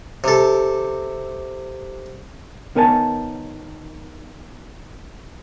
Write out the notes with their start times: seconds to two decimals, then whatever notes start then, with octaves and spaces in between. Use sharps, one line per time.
0.24 C3 A4
2.75 D#3 B3 A#4 C#5 G#5 A5